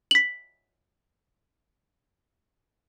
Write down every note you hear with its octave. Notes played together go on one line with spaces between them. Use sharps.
B6 F#7